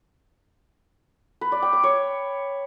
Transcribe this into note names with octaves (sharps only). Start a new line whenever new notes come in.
B4
D5
G5
D6
C#5